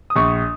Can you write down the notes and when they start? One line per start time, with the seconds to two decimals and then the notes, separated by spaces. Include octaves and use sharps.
0.10 D#6
0.16 A#1 C#6